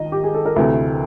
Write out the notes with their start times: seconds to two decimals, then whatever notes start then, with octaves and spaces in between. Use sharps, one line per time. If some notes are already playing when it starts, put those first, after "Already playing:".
Already playing: D#3 D#5
0.12 G4
0.24 G#4
0.35 A4
0.46 A#4
0.56 D2 C3 E3 A3 B4